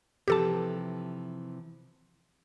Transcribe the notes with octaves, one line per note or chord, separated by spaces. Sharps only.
C3 E3 F3 G4 A4 A5